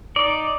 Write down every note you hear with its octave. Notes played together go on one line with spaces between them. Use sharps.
D#4 D5